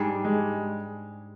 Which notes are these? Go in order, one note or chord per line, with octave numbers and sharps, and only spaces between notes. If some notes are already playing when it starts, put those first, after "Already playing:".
Already playing: G#2 G3 D4 G#4
G#3